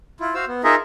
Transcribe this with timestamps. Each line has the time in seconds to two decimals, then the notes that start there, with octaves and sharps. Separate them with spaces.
0.20 E4 F4
0.35 F#4 C5 F5 E6
0.48 B3
0.64 D#4 F4 G#4 A#4 D#5 E5